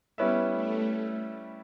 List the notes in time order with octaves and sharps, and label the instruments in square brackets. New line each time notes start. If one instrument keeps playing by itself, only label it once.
[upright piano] G3 C#4 E4 B4 E5 [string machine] B3
[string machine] A3